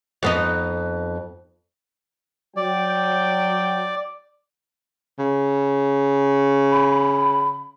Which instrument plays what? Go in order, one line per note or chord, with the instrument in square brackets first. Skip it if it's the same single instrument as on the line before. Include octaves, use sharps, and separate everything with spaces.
[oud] F2 B3 D#4
[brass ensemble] F#3 G5 [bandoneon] D5
[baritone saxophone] C#3
[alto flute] B5